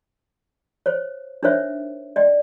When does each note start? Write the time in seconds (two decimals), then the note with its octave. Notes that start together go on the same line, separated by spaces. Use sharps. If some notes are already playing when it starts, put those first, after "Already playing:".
0.86 C5 C#5
1.43 D4 D#4 A#4 C5 C#5 E5
2.16 D5 D#5 G5